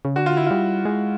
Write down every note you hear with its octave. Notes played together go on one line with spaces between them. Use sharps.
C#3
D3 F#4
F4
E4
G3 F4
G#3